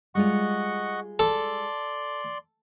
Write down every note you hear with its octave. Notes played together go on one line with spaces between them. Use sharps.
G3 G#3 F4 D#5 F#5 C#6
A4 D5 C6